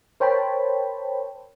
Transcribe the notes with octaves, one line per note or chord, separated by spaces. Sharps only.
A#4 C5 C#5 G5 A5 B5